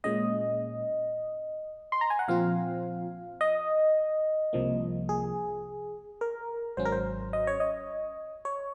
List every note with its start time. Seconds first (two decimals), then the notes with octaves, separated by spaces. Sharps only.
0.04 A#2 G#3 C#4 D#5
1.92 C6
2.01 A#5
2.10 G#5
2.19 F#5
2.28 A#2 F3 C4 F4 F5
3.41 D#5
4.53 C2 C3 F3 A#3
5.09 G#4
6.21 A#4
6.77 G#1 G#2 F#3 C#4 C5
6.85 A#4
6.92 C5
7.33 D#5
7.47 C#5
7.60 D#5
8.45 C#5